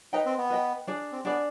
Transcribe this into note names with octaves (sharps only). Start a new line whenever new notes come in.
D#4 B4 D#5 G5
C4
B3
B4 D#5 G5
D4 G#4 D5
C4
B3 D4 G#4 D5